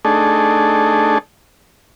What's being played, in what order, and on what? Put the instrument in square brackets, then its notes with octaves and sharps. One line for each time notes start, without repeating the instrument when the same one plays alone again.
[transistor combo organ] A3 D4 D#4 G#4 A4